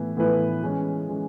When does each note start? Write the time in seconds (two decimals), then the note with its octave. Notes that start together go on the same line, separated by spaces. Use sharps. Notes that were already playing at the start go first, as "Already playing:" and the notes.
Already playing: A2 E3 B3 E4
0.17 A2 E3 B3 E4 B4
0.63 E3 G#3 C#4
1.09 E3 G#3 C#4